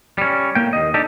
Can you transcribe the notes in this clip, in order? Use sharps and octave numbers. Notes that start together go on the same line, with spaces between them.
G3 C#4
A2 A#3 G5
D#2 D#5
D4 D#4 G4 A4